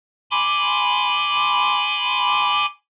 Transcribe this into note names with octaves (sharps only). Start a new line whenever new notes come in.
G#5 B5 C6 D6